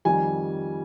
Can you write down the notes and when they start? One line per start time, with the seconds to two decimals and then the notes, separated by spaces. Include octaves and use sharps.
0.05 F2 D#3 G3 G#5